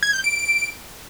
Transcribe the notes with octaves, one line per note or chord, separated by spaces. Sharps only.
G#6
G6
D7